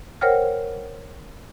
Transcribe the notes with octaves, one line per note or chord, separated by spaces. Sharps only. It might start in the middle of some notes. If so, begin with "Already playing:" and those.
A#4 C5 C#5 F#5 G5 F6